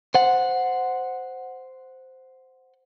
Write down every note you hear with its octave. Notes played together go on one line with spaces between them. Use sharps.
C5 F#5